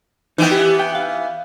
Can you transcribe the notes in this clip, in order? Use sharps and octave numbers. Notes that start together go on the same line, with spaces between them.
E3 B3 D#4 G5
G4
G5
F5